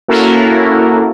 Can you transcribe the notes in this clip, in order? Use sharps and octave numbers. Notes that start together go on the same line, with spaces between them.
A#3 C#4 E4 F#4 A4 A#4